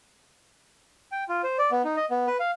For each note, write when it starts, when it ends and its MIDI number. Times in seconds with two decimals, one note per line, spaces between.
1.12 1.24 79
1.29 1.42 65
1.43 1.57 72
1.59 1.71 74
1.71 1.82 59
1.84 1.96 63
1.96 2.05 75
2.11 2.27 59
2.27 2.37 71
2.40 2.51 77